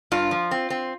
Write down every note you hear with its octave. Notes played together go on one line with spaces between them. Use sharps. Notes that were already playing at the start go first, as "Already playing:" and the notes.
G2 F4
F3
C4
C4